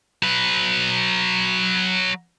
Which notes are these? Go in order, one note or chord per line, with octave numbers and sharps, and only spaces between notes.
F#3 B4